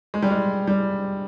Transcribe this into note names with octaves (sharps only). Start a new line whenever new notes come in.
G#3
G3
G#3
G3